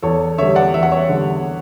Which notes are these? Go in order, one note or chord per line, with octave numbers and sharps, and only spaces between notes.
E2 A4 C#5
D3 G3 C#5 E5
D5 F#5
E2 E5
F#5
C#5 E5
D3 G3